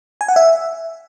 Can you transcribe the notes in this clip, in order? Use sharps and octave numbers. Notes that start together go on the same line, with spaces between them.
G#5
F#5
E5